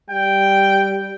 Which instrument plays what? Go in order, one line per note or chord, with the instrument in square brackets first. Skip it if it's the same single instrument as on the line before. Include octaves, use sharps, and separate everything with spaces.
[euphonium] G3 [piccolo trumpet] G5